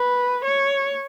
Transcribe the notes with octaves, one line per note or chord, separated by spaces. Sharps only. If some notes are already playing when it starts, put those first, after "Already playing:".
Already playing: B4
C#5